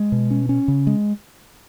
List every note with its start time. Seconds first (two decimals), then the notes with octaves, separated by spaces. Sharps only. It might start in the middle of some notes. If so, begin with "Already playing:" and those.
Already playing: G#3
0.12 B2
0.31 C#4
0.49 C#4
0.68 C#3
0.87 G#3